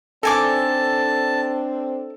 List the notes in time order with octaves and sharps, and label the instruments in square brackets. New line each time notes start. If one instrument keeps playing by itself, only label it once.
[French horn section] C4 D4 [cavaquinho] D#4 G#5 D6 [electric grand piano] A4 [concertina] A5